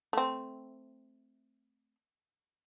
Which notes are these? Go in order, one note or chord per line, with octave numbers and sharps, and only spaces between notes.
A3 C4